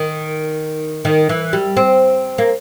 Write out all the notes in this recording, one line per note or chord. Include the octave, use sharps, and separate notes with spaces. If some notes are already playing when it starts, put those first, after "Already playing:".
Already playing: D#3
D#3
E3
G3
C4
A#3